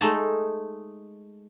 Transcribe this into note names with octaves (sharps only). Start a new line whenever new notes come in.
G#3 A3 D#4 A4 A5